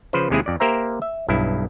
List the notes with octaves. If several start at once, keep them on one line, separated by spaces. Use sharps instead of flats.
C#3 F3 B4 C5
D#2 C3 G#3 C4 E4 G#4
F2 D5
A#3 G4 A#4 C5 E5 A#5
E5
B1 G2 E4